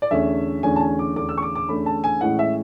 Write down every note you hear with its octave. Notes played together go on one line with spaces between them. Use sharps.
D5
E2 D3 A3 C#4 E5
E2 D3 A3 C#4 G#5
A5
G#5
D6
E2 D3 A3 C#4 D6
E6
C#6
D6
D6
E2 D3 A3 C#4 B5
A5
G#5
A2 E3 G#3 C#4 F#5
E5